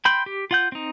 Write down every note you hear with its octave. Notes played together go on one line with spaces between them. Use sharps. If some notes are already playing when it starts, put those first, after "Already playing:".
G5 B5 C6 G6
G4
F4 F#5 G6
C4 D#4